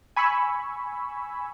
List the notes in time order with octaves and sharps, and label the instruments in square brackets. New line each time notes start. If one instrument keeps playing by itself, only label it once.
[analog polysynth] G#5 B5 C#6 E6